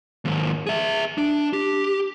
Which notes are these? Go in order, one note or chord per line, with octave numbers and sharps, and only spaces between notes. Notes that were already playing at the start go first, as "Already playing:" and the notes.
D#2 G#2
G#4 E5
D4
G4